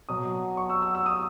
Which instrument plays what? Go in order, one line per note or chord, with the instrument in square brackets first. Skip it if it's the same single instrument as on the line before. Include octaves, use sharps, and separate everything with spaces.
[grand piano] B2 F#3 D#6
C#6
E6
E6
E6
D#6